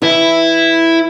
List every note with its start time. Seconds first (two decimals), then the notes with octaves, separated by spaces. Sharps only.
0.02 E3 E4